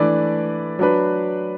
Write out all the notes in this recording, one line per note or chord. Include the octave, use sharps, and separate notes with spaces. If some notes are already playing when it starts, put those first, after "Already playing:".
Already playing: E3 A3 D4 B4 D5
F#3 D4 B4